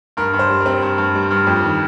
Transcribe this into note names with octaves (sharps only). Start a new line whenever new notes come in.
G2 A#4
G2
C5
G3
A#4
C4
G2
G2
G3
G2
F2
D#3